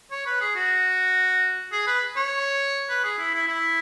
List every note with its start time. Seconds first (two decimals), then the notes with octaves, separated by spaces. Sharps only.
0.12 C#5
0.26 B4
0.41 G#4
0.56 F#4
1.72 G#4
1.87 B4
2.16 C#5
2.89 B4
3.04 G#4
3.18 E4
3.34 E4
3.48 E4